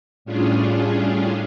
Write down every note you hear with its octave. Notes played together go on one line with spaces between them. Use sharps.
A2 G3 C#4 D4 F4 G#4